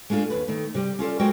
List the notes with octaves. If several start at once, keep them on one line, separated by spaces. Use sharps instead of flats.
G#3 A3 D4 F4 A4
D#2 B4
D#3 A3
C3 G3 G4
C#4 F4 A4 D5
F#2 G#3 F#4 A#4 C5 G5